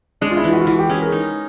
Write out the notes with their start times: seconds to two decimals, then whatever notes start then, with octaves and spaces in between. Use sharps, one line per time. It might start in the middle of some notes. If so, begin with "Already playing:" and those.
0.21 G#3 D4
0.31 F4
0.37 E4
0.44 E3 F4
0.52 F#4
0.60 F4
0.67 E3 F#4
0.79 G4
0.90 C#4 G#4
1.01 A#4
1.12 D#4